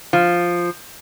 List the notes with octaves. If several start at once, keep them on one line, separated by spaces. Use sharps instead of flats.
F3